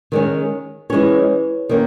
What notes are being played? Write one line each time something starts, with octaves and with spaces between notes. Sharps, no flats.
D#3 G#3 C#4
E3 G#3 C#4 C#5
D#3 A#3 C#4